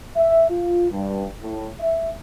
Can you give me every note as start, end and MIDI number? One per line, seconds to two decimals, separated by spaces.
0.16 0.49 76
0.50 0.88 65
0.91 1.27 43
1.43 1.68 45
1.80 2.12 76